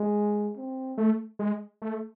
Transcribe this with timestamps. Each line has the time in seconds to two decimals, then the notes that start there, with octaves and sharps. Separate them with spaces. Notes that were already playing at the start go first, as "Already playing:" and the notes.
Already playing: G#3
0.57 C4
0.98 A3
1.39 G#3
1.82 A3